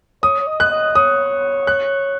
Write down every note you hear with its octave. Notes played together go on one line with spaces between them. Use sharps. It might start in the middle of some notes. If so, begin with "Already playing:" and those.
C#5 D#6
C#5
D#5
F#6
D#5
C#5 D#6
F#6